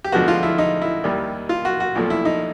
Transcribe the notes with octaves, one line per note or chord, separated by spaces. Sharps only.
G4
D2 D3 F3 G#3 B3 F#4
F4
E4
D#4
E4
D#2 D#3 G3
F4
F#4
F#4
B1 A#2 F3 A3
E4
D#4